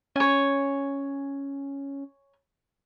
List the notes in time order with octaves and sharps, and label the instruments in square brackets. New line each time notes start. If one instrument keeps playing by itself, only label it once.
[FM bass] C#4 [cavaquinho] C#5 G#5